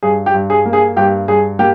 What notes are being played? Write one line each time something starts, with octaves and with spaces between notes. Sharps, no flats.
G2 G#4
G4
G2
G#4
A#3
G#4
G2 G4
G2 G#4
A#3 G4